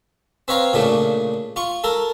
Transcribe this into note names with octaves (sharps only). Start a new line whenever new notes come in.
C4 B4 C#5 F5 A#5
A#2 C#3 A3 D4
F4 C#6
A4 A#4